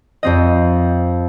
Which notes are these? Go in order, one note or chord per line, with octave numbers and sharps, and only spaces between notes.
F2 C4 D#5